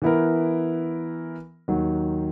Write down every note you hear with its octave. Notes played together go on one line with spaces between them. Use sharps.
E3 B3 E4 A#4
D#2 D#3 F#3